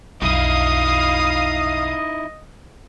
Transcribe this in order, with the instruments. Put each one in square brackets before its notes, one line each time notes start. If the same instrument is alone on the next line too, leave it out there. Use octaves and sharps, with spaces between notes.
[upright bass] B1 F2 [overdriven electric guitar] D#4 E4 [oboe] D#5 [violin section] F5 D#6